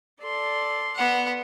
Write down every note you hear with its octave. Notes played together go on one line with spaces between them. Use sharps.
A4 D5 C6
B3 F#5